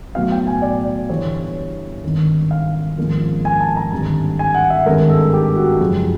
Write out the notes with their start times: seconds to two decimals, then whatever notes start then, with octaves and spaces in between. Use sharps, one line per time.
0.15 B1 A2 F#3 B3 F5
0.32 G5
0.47 G#5
0.62 D5
1.09 G1 G2 E3 G3 C#5
2.04 G#1 G2 D#3
2.51 F5
2.98 G#1 G#2 F3 A#3 C#4
3.45 G#5
3.60 A5
3.77 A#5
3.92 G#1 G2 D3 G3
4.39 G#5
4.54 F#5
4.70 E5
4.86 G#1 G2 D#3 G#3 A#4
5.09 A4
5.33 G4
5.56 F#4
5.80 F#2 C#3 F3 G#3